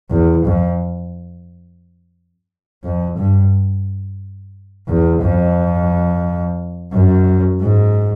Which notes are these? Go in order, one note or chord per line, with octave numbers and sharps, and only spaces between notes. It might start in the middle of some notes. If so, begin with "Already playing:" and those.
E2
F2
F2
G2
E2
F2
F#2
G#2